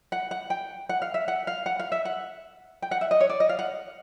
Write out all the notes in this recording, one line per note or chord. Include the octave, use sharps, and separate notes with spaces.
F#5
F#5
G5
F#5
F5
E5
F#5
F5
F#5
F5
E5
F#5
G5
F#5
E5
D#5
C#5
D5
D#5
F5
F#5